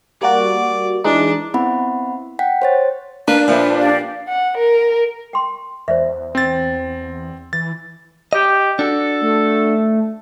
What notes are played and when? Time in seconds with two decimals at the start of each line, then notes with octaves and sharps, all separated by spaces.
0.21 G3 A#3 F#4 D5
1.04 E3 G#3 D4 D#4
1.54 B3 C4 E4 F#5 B5
2.39 F#5 G5 B6
2.62 C5 C#5 A6
3.28 A#3 D4 B4 F5
3.48 A#2 F3 B4 E5
3.80 G4 D5 F5
4.28 F#5
4.57 A#4
5.33 G5 C6
5.88 E2 C5 D5 E5
6.35 C4 A6
7.53 E3 A6
8.33 G4 D#5
8.79 D4 F#4 A4
9.21 A3